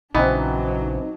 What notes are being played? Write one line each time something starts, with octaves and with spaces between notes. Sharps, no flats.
A#1 C#3 E3 F#3 B3 C4 D4 D#4